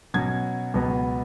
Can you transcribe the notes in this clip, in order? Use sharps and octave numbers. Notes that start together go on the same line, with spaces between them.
B2 F#3 C#4 G#6
C#2 B2 F#3 B3